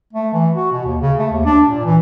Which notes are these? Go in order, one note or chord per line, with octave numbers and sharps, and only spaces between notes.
A3
E3
F#4
B2
D#2
C#3
A3
D#2
D4
A#2
E3